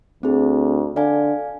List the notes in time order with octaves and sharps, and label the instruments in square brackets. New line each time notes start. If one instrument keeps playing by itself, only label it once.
[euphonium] D2 [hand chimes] C4 G#4
[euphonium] D3 [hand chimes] D5 F5 G#5